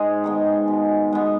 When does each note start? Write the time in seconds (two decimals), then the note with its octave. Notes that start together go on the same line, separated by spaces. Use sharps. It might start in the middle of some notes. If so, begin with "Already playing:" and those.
Already playing: G#2 G#3 G#4
0.24 D#3 G#3 B3
0.68 B2
1.12 G#3 B3